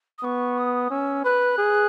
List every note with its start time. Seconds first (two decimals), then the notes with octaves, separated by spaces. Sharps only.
0.18 D#6
0.23 B3 C#6
0.58 D#6
0.91 C#4 E6
1.24 B4 F#6
1.58 G#4